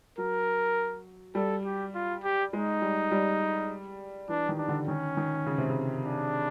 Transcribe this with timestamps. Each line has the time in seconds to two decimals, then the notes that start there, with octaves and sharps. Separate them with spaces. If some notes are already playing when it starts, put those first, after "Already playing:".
0.18 F#3 A#4
1.35 G3 A4
1.65 G4
1.94 F4
2.24 G4
2.53 G#3 D#4
2.82 G3
3.11 G3
4.29 E3 D4
4.49 D#3
4.58 D4
4.68 D3
4.87 D#3 C#4
5.17 D#3
5.46 C#3
5.58 C3
5.70 C#3
6.05 D4